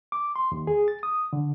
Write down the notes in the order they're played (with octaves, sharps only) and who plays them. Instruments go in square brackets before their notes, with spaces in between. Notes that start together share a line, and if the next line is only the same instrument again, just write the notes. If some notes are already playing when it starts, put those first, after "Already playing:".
[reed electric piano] D6
C6
D#2
G#4
A6
D#6
D3